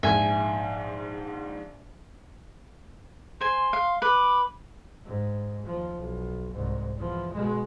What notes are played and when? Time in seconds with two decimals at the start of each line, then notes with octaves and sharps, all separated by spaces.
0.03 A#1 G#2 E5 G#5
3.41 C5 G#5 C6
3.73 F5
4.02 B4 D6
5.05 G#2
5.66 D#2 F3
5.96 B1
6.52 C2 G#2
6.96 E2 F3
7.33 B2 G#3